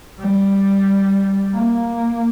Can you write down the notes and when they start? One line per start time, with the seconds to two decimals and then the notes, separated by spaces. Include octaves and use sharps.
0.20 G3
1.54 A#3